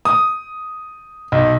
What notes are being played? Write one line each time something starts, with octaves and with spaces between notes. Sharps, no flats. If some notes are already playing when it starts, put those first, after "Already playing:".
D#6
B1